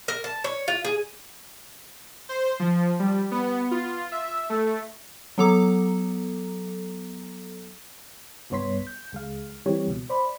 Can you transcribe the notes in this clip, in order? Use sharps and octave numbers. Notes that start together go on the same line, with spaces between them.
A#4
A5
C#5
F4
G#4
C5
F3
G3
B3
F4
E5
A3
F#3 B3 A4 A#5 D6
C2 G2 B3 C#5 C6 B6
G6
C#2 G#3 F5
E3 G3 C4 G4 C#5
C#2 B2
C5 D5 B5